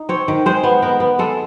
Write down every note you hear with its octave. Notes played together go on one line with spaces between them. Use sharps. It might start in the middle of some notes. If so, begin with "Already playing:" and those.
Already playing: D#4
C4 C#5
D#3
G#3 C5
B3
B3 A#4
B3
G#3 A4